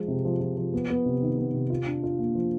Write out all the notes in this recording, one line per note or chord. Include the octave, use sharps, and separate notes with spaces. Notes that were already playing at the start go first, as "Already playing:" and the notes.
Already playing: F3 G#3
C3
F3
F3
F3
B3
B3
C3
D#3
B3
C3
F4
D4
F4
A#3
F3